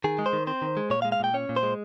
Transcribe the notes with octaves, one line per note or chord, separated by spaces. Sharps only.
D#3 G#4
G#3
C5
D#3
C4 C5
D#3
G#3
A#2 C#5
F5
G#3
F5
A#2 G5
C#4 C#5
A#2
C5
G#3